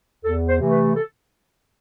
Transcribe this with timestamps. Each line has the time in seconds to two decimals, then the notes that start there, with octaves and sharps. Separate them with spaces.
0.24 E2 A4
0.49 C5
0.60 C3 E3 A3
0.72 B4
0.95 A4